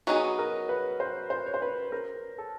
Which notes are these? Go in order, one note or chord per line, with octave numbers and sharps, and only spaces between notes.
F#3 B3 D#4 F#4 G#4
A#4
B4
C5
C5
C#5
C5
B4
A#4
A4